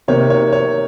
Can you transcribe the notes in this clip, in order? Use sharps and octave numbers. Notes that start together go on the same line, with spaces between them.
C3 D#3 A#3 C#5
C#5
C#5